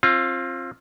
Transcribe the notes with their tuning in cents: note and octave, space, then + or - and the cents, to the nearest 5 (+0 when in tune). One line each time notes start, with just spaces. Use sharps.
C4 +30 F4 +0